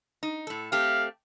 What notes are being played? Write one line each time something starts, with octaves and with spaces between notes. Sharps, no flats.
D#4
A2 A4
A3 C4 G4 F5